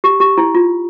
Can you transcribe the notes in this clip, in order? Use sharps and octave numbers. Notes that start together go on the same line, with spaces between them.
G4
G4
E4
F4